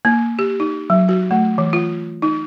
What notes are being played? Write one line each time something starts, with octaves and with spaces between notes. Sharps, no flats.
A#3
G4
D#4
F#3
F#4
A3
E3
F4
D#4